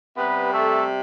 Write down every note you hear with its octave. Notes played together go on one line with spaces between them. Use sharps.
C3 G3 B3 B4
A3 A4